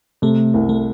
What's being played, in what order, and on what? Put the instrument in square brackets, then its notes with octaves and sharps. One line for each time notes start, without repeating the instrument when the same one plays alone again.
[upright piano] C3 [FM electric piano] A3
[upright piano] C2
[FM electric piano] A3